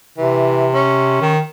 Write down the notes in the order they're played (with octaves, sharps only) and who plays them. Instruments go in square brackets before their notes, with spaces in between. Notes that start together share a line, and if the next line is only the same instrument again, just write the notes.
[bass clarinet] C3 [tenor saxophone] E3
[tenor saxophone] C#4
[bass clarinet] D#3